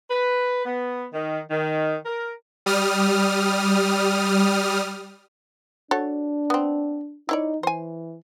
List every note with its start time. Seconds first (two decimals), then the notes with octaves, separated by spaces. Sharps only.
0.11 B4
0.65 B3
1.13 D#3
1.51 D#3
2.06 A#4
2.66 G3 D#6 F6
5.91 D4 F#4 A4 C#5
6.50 B3 C4
7.29 D#4 E4 C#5 D5
7.63 E3 C5 G#5